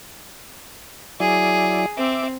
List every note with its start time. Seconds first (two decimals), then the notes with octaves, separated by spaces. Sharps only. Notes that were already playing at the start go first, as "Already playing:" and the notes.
1.20 F#3 E4 G#4 D5
1.97 C4 E5 D6